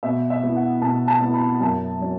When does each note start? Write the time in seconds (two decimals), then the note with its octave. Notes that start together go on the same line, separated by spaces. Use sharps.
0.03 B2 E5
0.30 E5
0.43 B3 E4
0.56 F#5
0.81 B2 A5
1.08 A5
1.21 B3 E4
1.34 B5
1.60 F#2 A5
1.99 F#3 C#4